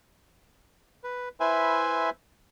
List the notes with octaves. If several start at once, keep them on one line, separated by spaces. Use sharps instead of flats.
B4
E4 B4 C5 E5 G#5